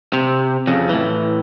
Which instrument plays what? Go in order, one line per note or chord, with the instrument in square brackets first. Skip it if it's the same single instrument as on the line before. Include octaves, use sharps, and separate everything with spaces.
[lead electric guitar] C3
F2 C#3
A2 E3